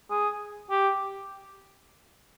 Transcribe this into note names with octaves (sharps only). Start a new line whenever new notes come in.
G#4
G4